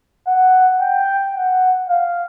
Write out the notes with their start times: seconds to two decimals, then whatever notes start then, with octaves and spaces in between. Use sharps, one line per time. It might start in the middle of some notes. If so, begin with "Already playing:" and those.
0.27 F#5
0.81 G5
1.35 F#5
1.89 F5